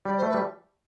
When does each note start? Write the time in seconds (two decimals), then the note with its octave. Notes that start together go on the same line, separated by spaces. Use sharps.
0.05 G3 D5
0.17 C5
0.22 A3
0.29 B4
0.34 G3